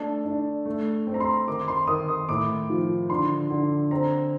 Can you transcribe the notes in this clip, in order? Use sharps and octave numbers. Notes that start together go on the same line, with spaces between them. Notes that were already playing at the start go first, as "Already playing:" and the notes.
Already playing: A3 D4 A5
D4
A3
C4
A#5
C6
D#3 D6
C6
D#3 D#6
D#6
A2 D6
F3
D3 C6
D3
C4 A#5